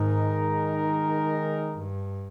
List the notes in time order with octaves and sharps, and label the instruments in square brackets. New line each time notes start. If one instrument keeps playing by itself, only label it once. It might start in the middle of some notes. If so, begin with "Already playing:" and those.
Already playing: [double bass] G#2 [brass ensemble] D#3 G#3 D#4 A#4
[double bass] G2